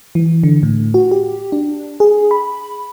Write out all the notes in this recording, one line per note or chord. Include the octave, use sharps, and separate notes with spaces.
E3
D3
A2
F#4
G4
D4
G#4
B5